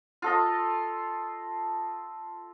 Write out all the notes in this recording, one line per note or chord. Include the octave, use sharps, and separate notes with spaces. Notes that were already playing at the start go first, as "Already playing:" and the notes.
F4 A4 D#5